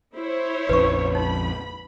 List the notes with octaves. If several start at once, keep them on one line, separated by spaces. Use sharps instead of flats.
E4 C5 C#5
A#1 F2 C#4 B4 C#6
D#4 B5